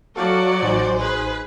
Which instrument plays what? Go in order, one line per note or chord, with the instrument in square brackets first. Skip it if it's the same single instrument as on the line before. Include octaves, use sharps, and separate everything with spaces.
[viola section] F#3 F#4 D5 [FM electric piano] A4 F5 A5
[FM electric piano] A1 D#4 G#5 [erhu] C5
[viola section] G#4 B4